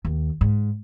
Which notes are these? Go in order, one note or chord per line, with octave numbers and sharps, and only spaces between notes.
D#2
G#2